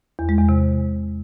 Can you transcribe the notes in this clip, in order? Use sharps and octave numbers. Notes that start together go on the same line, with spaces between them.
E2
G#3
E2
C3